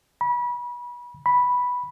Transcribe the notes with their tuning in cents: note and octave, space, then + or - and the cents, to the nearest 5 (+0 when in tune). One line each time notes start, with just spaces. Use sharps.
B5 -30
B5 -5